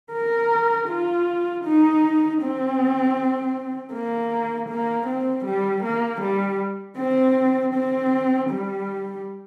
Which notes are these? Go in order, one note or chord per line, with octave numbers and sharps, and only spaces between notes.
A#4
F4
D#4
C4
A#3
A#3
C4
G3
A#3
G3
C4
C4
G3